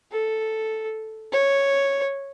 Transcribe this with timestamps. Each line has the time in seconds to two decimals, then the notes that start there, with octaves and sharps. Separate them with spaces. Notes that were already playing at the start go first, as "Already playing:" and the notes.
0.12 A4
1.32 C#5